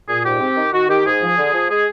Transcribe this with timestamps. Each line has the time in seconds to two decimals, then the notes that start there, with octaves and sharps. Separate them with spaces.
0.09 A#2 G#4
0.24 G#2 G4
0.40 C4
0.56 D#3
0.73 D#3 F#4
0.89 D#3 G4
1.06 G#2 G#4
1.22 F3
1.38 D3
1.53 F3
1.69 G#3 G#4